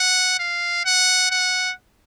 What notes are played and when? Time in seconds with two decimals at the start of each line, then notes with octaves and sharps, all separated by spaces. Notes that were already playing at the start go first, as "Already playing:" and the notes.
Already playing: F#5
0.40 F5
0.85 F#5
1.31 F#5